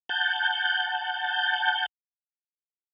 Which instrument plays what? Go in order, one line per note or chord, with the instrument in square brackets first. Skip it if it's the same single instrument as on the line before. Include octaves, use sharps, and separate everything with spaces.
[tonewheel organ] F#5 A5 G6